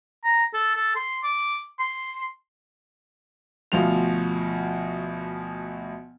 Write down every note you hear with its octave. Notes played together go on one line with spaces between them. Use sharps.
A#5
A4
A4
C6
D6
C6
D2 B2 F3 F5 F7